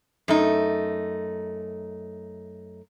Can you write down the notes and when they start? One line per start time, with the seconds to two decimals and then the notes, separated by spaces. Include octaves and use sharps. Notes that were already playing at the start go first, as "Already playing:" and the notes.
0.28 F#2 A3 D#4